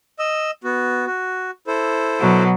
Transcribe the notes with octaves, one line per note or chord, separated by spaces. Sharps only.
D#5 E6
B3 F#4
F#4
E4 A4 C5
B2 F#3